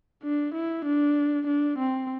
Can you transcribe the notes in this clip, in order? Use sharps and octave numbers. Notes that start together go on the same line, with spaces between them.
D4
E4
D4
D4
C4